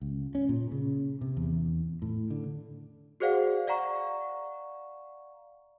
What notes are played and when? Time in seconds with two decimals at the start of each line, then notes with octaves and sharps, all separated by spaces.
0.01 C#2
0.35 C#4
0.49 A#2
0.72 C#3
1.21 C3
1.37 E2
2.02 A2
2.31 D3
3.20 F#4 G#4 C5 D5 F5 F#5
3.67 D5 F5 F#5 A#5 C#6